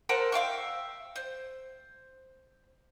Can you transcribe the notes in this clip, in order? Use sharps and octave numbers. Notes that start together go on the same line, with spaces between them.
A4 A#4 C5 F#5
E5 F5 G5 C#6
C5